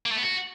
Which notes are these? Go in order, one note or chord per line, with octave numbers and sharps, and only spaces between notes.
A#3
A3
B3
F#4